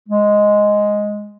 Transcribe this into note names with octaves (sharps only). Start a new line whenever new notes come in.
G#3